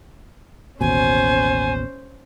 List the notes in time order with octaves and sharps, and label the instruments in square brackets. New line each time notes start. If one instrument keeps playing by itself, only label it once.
[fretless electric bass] A1 D#2 B2 [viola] C#4 C5 [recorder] G#5